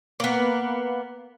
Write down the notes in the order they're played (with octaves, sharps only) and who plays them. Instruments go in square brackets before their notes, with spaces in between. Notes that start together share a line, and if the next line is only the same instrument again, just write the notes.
[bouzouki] A#3 B3